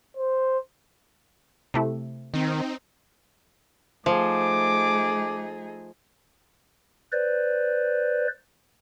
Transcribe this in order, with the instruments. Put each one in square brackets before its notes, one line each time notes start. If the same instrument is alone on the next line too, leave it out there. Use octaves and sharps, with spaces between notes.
[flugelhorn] C5
[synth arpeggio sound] C3 A3 E4
[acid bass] D#3 [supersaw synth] C4 D#4
[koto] F3 [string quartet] A3 D#4 G#4 [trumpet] D6
[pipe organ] B4 C5 D5